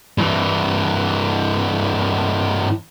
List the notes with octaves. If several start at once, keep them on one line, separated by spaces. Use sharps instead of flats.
G2 E3